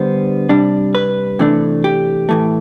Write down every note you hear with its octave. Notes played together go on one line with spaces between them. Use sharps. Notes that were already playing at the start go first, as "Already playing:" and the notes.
Already playing: D3 G3 B3 D4 C5
C3 G3 D4
B4
C3 E3 A3 D4
G4
A2 E3 A3